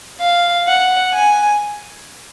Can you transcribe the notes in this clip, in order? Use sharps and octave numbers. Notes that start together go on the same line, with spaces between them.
F5
F#5
G#5